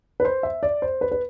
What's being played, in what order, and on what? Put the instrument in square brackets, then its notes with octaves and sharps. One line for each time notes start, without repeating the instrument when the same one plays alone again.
[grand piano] B4
C5
E5
D5
C5
B4
B4